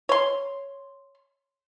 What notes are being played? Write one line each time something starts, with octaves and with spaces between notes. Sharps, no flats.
C#5 C6